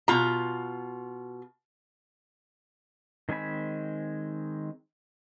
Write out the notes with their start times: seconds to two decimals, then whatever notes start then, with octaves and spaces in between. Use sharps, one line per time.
0.08 B2 F4 A#5
3.29 D#3 G#3 C4 G#5 B5